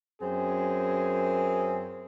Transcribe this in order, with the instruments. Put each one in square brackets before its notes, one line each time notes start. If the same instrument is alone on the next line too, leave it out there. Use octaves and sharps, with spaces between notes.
[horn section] F#2 C4 G#4